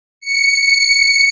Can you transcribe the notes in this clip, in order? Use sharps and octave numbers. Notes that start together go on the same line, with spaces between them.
C#7